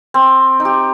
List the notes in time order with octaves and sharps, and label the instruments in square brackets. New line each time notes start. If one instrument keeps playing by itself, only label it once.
[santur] C4
D#4
G4